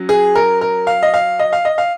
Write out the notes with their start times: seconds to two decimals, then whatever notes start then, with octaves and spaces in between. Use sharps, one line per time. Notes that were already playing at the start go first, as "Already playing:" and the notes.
Already playing: F#3 C#4
0.09 G#4
0.35 A#4
0.61 A#4
0.87 F5
1.03 D#5
1.14 F5
1.39 D#5
1.53 F5
1.65 D#5
1.78 F5